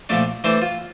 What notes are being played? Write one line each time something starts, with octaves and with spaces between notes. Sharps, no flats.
A#2 F3 A3 D4
E3 A3 D4 C5
F4